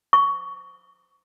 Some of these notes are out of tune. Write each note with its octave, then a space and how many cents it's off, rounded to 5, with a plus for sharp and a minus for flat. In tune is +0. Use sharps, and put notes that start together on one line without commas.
C#6 +15